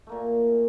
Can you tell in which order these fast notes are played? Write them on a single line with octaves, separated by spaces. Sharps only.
A3 A#3 A#2